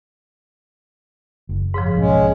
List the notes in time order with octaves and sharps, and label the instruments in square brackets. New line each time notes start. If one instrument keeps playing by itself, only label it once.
[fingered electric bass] F#1
[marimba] G#2 C#3 F3
[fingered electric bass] B1 [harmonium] G#3 C#4